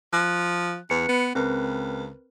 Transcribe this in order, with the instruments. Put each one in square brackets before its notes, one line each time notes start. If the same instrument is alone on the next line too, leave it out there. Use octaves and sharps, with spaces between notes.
[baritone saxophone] F3 [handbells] F#6
[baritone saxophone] E2 [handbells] B4 C#7
[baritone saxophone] B3
[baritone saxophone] C#2 [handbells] C4 A#4 B4